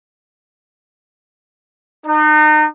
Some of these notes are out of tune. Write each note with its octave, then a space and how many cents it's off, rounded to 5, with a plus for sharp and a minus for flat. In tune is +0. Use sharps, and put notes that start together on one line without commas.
D#4 -35